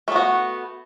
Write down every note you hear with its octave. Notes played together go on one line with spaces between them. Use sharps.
A3 B3 F#4